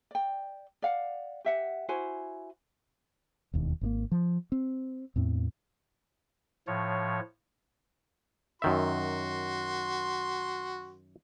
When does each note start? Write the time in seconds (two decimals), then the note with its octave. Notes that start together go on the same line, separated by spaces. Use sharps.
0.11 D5 G5
0.82 D5 F5 F#5
1.45 G4 E5 F#5
1.89 E4 F#4 C5 G#5
3.54 E1 D#2
3.81 G#1 C#3 A#3
4.11 F3
4.52 C4
5.16 E2 A2 C4
6.67 A2 F3 C#5
8.62 F#2 D#3 F#4 E5 C6